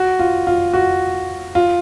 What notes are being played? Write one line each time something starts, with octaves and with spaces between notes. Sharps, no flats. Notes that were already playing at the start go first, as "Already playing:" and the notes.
Already playing: F#4
F4
F4
F#4
F4